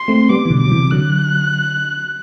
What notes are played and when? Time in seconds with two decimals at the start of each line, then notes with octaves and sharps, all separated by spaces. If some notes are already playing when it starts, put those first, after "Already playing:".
Already playing: C6
0.08 A3 C4
0.29 G3 B3 D6
0.45 E3
0.50 B2 D3
0.60 F#3 D6
0.71 C3 E3
0.91 D3 F#3 F#6